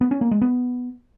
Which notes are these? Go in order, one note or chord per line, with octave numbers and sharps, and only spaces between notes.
B3
C#4
A#3
G#3
B3